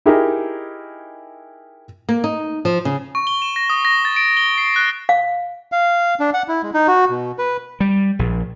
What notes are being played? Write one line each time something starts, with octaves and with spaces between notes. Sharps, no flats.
D#4 E4 G4 G#4 A#4
A#3
D#4
F3
C#3
C#6
G7
E7
A#6
D#6
A#6
A6
D7
G7
C7
F#6
F5
F5
D4
F#5
E4
G#3
D#4
F#4
B2
B4
G3
A#1